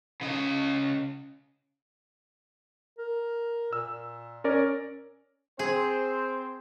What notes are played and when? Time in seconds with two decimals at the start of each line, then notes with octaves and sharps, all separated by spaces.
0.21 C#3 D#5
2.98 A#4
3.73 A#2 E6
4.44 C#4 A#4 D5
5.59 C4 G#4 C5